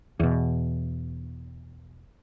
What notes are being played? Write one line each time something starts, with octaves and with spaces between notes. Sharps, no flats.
E2 B2